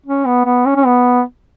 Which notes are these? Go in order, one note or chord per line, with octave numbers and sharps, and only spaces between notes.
C#4
B3
B3
C#4
C#4
B3